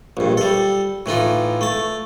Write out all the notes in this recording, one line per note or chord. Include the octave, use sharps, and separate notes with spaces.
A#1 G2
G3 A4
A2 E3 D#4 F4
A3 A5